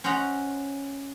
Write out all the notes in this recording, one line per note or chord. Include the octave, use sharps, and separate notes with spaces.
C#4 C5 D#5 F#5 A#5